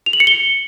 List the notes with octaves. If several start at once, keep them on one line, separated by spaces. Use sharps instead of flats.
F7
F#7
C#7
G7